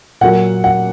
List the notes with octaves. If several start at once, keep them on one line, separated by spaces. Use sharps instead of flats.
A#2 F#3 A#3 F#5
F#5